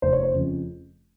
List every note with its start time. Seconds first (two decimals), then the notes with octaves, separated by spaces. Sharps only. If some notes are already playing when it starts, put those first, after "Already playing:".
0.02 F1 C5
0.13 C#5
0.23 C5
0.34 F2 C#3